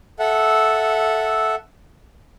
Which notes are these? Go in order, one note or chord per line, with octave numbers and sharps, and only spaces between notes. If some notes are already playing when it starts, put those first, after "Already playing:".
A4 E5 F#5